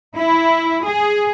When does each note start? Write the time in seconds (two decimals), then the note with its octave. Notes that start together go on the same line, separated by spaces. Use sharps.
0.16 E4
0.86 G#4